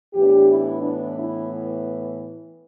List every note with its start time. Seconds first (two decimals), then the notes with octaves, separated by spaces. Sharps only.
0.13 A2 E3 B3 D4 G4
0.48 E4
0.82 D4
1.18 E4